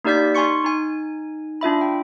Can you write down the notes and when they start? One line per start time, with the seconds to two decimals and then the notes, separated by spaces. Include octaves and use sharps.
0.04 A#3 D#4 G4 D5 G6 B6
0.35 D#4 G#5 C6 C#6 C#7
0.64 D#4 G#5
1.61 D4 F4 E5 B5
1.81 G5